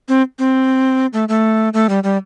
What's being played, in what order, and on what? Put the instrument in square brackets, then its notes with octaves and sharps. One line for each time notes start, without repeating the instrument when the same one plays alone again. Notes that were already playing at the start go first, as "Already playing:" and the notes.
[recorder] C4
C4
A3
A3
A3
G3
G3